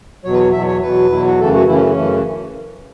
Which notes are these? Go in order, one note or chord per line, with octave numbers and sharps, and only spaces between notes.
E2 B2 F#3 C#5
B4
C#5
E2 B2 F#3 E5
C#5
E2 B2 F#3 B4
E2 B2 F#3 E4
F#4
F#2 C#3 E3 A3 A4
F#4
F#2 C#3 E3 A3 E4
C#4
C#4
F#2 C#3 E3 A3